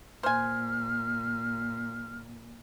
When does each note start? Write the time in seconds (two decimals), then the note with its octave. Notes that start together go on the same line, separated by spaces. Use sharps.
0.23 A#2 C5 G#5 F6